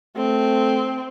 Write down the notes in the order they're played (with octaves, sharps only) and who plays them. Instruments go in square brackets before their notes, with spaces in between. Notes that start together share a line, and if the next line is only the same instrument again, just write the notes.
[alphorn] A3 [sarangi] C4